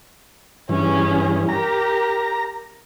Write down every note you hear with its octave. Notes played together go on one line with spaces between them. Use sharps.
G2 E3 C#4 G#4
G4 A#4 A#5